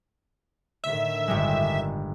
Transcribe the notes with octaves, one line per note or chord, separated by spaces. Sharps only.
A2 D3 D#3 E5
G1 G3 G#3